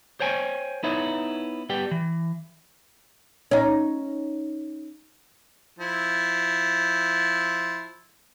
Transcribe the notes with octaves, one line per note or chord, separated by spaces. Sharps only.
C5 C#5 G5 G#5
B3 D#4 E4 C#5
G3 B3 G4 G5
E3
C#4 D#4
F3 E4